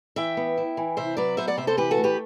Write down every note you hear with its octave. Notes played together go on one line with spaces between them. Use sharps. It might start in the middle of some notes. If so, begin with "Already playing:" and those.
E3 E5 G5
B3
E4
E3
C3 C5 E5
F#3 B4 D5
B3 C5 E5
D5 F#5
C3 C5 E5
A4 C5
E3 G4 B4
F#4 A4
A3
G4 B4